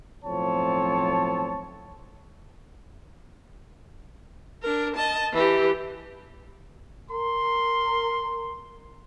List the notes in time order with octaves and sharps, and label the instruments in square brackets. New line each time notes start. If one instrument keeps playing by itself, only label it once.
[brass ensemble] B1 A2 F3 C4 C#5 A5
[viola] D4 A#4
D#5 A5
E3 G4
[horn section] A#4 C6